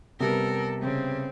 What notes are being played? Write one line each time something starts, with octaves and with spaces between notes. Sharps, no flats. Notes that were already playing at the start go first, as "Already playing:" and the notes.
C3 G3 B3 A4 A#4
C#3 C4